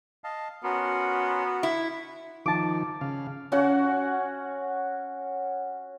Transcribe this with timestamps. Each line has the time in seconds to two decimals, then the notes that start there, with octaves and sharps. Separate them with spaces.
0.24 D#5 F5 A5
0.64 B3 C#4 F#4 A#4 C6
1.63 E4
2.46 D#3 F3 A5 D6
3.01 C#3 F5
3.52 C#4 F#4 F#5